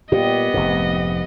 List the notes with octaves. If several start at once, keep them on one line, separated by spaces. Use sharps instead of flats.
A#2 B3 G4 D#5
F1 G#2